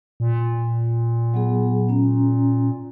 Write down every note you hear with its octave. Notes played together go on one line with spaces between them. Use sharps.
A#2
F#3 B3 G#4
C#4 A#5